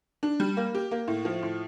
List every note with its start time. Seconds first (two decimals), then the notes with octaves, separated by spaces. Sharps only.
0.23 D4
0.40 G3
0.57 A#3
0.75 G4
0.91 A#3
1.08 A2
1.25 F3
1.43 A2